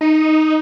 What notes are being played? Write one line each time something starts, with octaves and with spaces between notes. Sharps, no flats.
D#4